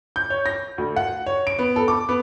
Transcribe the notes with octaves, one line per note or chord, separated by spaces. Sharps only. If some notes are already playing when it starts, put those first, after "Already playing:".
G6
C#5
A#6
D2
F#5
C#5
D7
B3
A4
D6
B3